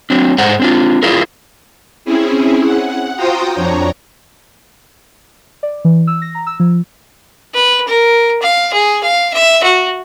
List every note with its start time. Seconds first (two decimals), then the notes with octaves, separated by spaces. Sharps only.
0.10 F#3 C4 D4
0.38 G#2 G#3 C5 F#5 A#5
0.60 C4 D4 F4
1.03 E4 F4 G#4 A#4
2.05 C4 C#4 E4 G#4
2.63 F#5
3.16 F4 F#4 C5 G5 A#5 D#6
3.53 F2 D4 C#5 A#5
5.63 D5
5.85 E3
6.07 E6
6.22 A#6
6.35 A#5
6.47 E6
6.60 F3
7.54 B4
7.87 A#4
8.42 F5
8.73 G#4
9.03 F5
9.33 E5
9.63 F#4